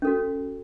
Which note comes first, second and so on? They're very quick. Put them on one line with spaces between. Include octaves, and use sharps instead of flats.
C#4 A4 F#4